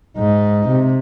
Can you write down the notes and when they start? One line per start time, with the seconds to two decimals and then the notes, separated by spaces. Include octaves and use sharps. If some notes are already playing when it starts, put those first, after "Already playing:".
0.18 G#2 D#4
0.69 C3